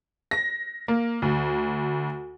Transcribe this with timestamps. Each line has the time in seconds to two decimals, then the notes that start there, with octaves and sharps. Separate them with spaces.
0.31 A#6
0.88 A#3
1.22 D2